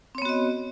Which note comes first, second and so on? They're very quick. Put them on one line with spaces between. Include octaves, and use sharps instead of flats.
C4 C#5 B3 F#4 D#5